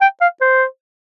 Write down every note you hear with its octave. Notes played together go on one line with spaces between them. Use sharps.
G5
F5
C5